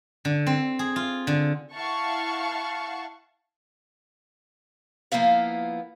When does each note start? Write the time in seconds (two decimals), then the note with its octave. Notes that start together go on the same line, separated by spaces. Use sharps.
0.25 D3
0.46 C4
0.79 G#4
0.96 F4
1.27 D3
1.74 E4 F5 F#5 A5 C#6
5.12 F3 A#3 B3 E4 F5